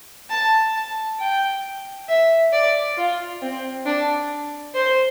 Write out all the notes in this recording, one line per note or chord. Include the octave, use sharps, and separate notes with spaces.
A5
A5
G5
E5
D5
F4
C4
D4
C5